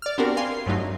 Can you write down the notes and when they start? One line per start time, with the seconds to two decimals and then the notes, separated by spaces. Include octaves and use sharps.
0.02 D5 F6
0.18 B3 C4 D4 F#4 G4 A#4
0.37 F5 G#5 C6
0.66 G2 F#3 A3 D#4